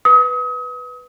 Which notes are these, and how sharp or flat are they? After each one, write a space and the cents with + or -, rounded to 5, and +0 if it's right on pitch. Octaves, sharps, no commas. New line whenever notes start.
B4 +0 D#6 +35